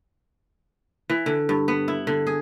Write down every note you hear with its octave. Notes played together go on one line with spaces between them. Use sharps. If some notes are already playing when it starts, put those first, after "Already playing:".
E3
D3
G2
B3
E4
D3
G#4